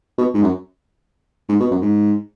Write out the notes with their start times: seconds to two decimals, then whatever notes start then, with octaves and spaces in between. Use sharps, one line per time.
0.18 B2
0.34 G#2
0.43 F#2
1.49 G#2
1.60 B2
1.71 F#2
1.82 G#2